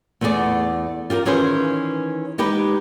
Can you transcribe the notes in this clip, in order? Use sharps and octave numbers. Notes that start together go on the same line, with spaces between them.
E2 A3 B3 G#4 D5
F4 G4 G#4 A#4
D#3 E3 C#4 G#4 B4 C5
G#3 D#4 G4 B4